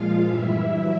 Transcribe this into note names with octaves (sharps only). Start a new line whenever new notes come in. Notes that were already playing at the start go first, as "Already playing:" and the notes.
Already playing: A#2 F3 G#3 F4 F5
G2 E3 G3 E4 E5
F#3